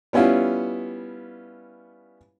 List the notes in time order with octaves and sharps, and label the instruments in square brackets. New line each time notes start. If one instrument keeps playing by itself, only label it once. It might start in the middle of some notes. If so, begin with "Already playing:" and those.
[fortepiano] G3 B3 C#4 E4 F4